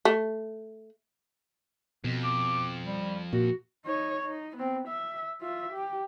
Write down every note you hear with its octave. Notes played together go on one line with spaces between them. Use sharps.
A3
F2 B2
D6
G3
A#2 F#4
D#4 C#5
D#4
B3 C4
E5
F4 E5
G4